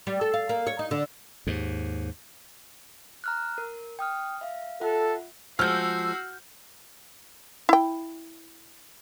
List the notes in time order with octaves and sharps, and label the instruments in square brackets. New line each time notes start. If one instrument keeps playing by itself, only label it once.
[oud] G3
A4
F5
A#3
C#5
D#4
D3
[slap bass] D#2 G#2
[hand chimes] A#5 F6 F#6
A#4
G5 D#6 F6
E5 F5
[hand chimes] F4 E5 F#5 [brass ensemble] A4
[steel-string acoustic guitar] F3 G#3 [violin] F#4 C7 [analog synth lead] E6 [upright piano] F6 G6
[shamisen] E4 G5